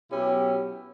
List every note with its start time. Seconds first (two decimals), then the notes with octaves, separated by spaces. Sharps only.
0.11 B2 F#3 C#4 E4 G4